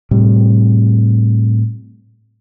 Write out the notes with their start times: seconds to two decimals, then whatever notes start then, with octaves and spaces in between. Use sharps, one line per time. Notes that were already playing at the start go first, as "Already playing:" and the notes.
0.11 A2 C3 G3